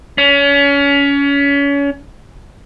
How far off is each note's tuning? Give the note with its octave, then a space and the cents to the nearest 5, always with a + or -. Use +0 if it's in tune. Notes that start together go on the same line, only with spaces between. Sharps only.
C#4 +30